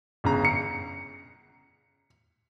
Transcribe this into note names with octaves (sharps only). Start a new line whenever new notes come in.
G1 C#3 A#5
C#7